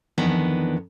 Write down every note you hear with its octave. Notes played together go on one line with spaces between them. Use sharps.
F2 D#3 E3 B3 D4